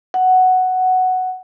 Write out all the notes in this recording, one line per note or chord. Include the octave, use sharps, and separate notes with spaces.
F#5